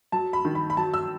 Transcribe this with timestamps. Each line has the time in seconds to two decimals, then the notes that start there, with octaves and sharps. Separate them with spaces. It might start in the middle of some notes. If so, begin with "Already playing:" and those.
0.12 F#3 A5
0.33 B5
0.45 D#3
0.55 B5
0.70 B5
0.77 F#3 A5
0.94 E6